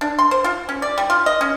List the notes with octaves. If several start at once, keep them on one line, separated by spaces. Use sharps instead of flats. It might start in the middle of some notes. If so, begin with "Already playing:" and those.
D4
C6
C5
F4
C#4
D5
G3
F4
D#5
C#4